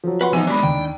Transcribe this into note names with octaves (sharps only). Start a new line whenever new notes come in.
F3 F#3
B4 F#5 C6
E3 F3 B3 D#4 D#7
F#3 G#3 D4 B5
D#2 G5